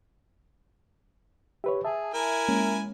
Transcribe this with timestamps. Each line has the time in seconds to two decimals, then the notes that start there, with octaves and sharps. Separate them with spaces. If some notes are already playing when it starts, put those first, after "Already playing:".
1.64 G4 B4 C#5 E5
1.85 G#4 E5 A5
2.14 E4 A#4 G#5
2.49 G#3 A#3 C#4